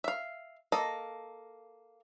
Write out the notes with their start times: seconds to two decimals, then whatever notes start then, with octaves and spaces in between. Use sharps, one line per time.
0.04 E5 F5
0.72 A#3 A4 D#5